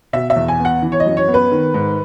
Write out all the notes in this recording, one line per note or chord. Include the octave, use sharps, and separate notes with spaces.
B2 E5
E5
E2
G#5
B3
F#5
E3
C#5
D#5
F#2
C#5
B3
B4
D#3
G#2